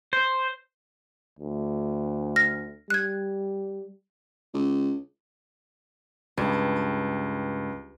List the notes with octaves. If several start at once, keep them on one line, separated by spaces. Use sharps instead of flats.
C5
D2
F6 A#6
G3 F#6 G#6
C#2
C#2 G2